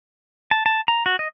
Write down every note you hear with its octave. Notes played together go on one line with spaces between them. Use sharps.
A5
A5
A#5
F#4
D#5